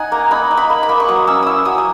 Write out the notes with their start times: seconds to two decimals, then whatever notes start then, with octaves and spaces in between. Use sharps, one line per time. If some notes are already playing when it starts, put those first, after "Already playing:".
Already playing: D#4 F#5 G#5
0.12 A#3 A#5
0.31 D#4 B5
0.51 D#4
0.57 B5
0.70 A#3
0.83 B5
0.89 A#3
1.00 C#6
1.08 F#3 D#6
1.27 C#4 E6
1.43 E4 D#6 E6
1.65 F#3 D#6
1.78 D#6